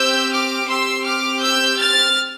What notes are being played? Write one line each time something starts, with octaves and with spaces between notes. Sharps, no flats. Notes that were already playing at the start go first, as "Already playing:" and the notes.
Already playing: C4 G4 E6 G6
D6 F6
C4 G4 C6 E6
D6 F6
E6 G6
F6 A6